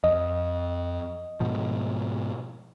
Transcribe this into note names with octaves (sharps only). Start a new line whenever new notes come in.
F2 D#5
G#2 B2 F3